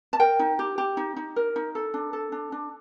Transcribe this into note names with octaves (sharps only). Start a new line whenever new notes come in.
A5
A#4 G5
D#4
G4
G4
D#4
D#4
A#4
D#4
A4
D4
A4
D4
D4